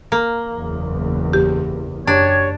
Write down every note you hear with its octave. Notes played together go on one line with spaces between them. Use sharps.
A#3
F#1 E2
G4
F#2 D4 G4 C#5